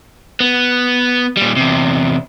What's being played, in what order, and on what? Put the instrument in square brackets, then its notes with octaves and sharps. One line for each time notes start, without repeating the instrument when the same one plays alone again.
[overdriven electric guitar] B3
A#2 G3
E2 C3